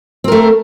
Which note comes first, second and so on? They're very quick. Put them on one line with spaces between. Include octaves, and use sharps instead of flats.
C4 A#4 A3